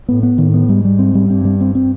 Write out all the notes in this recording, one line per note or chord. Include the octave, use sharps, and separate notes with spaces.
A2 B3
B3
A2 D#3
B3
G#2 G3
G3
C4
G3
G2 C4
G3
C4
C4